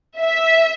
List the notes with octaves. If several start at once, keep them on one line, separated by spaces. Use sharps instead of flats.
E5